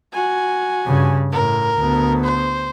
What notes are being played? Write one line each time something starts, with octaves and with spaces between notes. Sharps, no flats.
F#4 G#5
G2 C#3
A2 A#4
D2 B3
C5